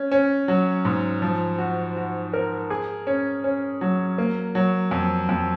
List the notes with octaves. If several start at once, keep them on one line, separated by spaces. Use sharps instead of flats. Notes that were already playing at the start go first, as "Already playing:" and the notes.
Already playing: C#4
C#4
F#3
G#2
F3
F#4
F#4
A#4
G#4
C#4
C#4
F#3
A#3
F#3
F2
F2